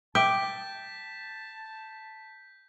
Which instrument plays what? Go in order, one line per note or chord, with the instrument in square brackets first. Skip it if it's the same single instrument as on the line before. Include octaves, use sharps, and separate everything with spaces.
[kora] G5 [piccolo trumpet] A5 [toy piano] D6 [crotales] G6 B6